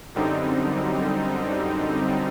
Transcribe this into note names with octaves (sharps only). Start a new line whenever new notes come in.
F#2 D3 G3 C4 D#4